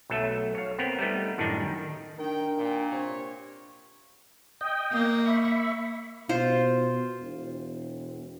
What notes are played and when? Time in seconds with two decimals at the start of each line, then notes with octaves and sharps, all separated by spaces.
0.10 B1 F#3 A3 A4 E5
0.55 C#5 F5
0.79 B3 C4 A#4
0.99 G3 A3 B3 D#4
1.38 F#2 A2 D#3 G3 D4 D#4
1.66 D#3
2.18 D#3 D4 A#4 G5
2.58 A#2 G5
2.91 C3 C#5
4.61 D#5 G5
4.92 A#3
5.26 E5 B5 C#6
6.29 B2 F4 C5
7.21 E1